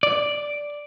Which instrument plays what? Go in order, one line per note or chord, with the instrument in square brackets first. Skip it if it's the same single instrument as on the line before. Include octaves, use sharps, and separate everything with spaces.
[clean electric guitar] D5